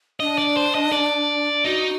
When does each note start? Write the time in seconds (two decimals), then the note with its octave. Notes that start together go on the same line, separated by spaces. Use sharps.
0.20 D4 D#5
0.38 D5
0.57 C5
0.75 D#5
0.92 D5
1.65 D#4 F#4